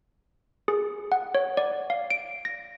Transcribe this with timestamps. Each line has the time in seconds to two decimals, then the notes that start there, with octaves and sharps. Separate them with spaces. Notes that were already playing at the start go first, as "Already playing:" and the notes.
0.68 G#4
1.12 F#5
1.35 C#5
1.57 D5
1.90 F5
2.10 D7
2.45 A#6